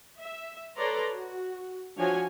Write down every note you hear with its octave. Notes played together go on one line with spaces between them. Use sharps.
E5
A4 B4 C#5 D5 A#5 C6
F#4
F3 D4 F#4 C#5 G#5